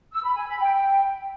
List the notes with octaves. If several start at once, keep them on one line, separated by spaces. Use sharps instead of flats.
E6
B5
G#5
B5
G5